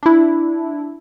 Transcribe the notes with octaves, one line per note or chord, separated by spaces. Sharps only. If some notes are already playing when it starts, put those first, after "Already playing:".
D4 E4